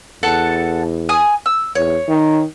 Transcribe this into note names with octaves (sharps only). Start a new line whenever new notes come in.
E2 A4 F#5 A5
G#5 D#6
E6
E2 C#5
D#3